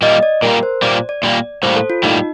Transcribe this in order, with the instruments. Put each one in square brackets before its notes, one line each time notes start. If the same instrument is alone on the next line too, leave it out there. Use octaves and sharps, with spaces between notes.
[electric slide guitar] A#2 G3 A#3 [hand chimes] D#5
[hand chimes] D5
[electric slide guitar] A#2 G3 A#3 [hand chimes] A#4
[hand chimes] C5
[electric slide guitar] A#2 G3 A#3 [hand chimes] D5
[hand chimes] D5
[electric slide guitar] A#2 G3 A#3
[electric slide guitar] A2 G3 A#3 [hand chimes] C5
[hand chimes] A4
F4
[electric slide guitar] A2 G3 A#3 [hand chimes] D#4